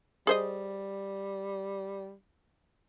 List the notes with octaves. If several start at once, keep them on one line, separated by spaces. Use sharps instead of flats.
G3 G#4 C5 D#5